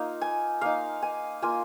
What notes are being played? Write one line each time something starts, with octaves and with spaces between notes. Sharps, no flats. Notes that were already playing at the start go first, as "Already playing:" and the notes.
Already playing: A#3 D#4 F4 F5
G#5
A#3 D#4 F5
G#5
A#3 F4 G#5